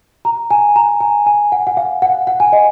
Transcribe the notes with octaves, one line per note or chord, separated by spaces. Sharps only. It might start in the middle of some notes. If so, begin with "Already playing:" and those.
A#5
G#5
A#5
G#5
G#5
F#5
F#5
F5
F#5
F#5
G#5
D#5